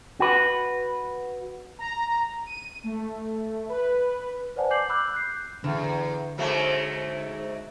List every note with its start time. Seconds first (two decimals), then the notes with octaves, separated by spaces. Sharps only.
0.20 F#4 B4
1.79 A#5
2.46 D#7
2.84 A3
3.69 B4
4.56 B4 C5 D5 F#5 G#5 A5
4.71 D6 G6 C7 F#7
4.89 B5 D6 E6 F#6 G6
5.14 F#6 G6 C7
5.64 E2 D3
6.38 G#2 F#3 A3